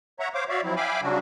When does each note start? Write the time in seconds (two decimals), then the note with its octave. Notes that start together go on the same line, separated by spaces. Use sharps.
0.20 C#5 E5 F#5 A#5
0.34 C5 C#5 F5 D6
0.49 F#4 C#5 D5 E5 F5
0.64 F3 F#3 C4 E4
0.76 E5 F5 G5 G#5 B5 D6
1.02 C#3 F#3 G3 D4 F#4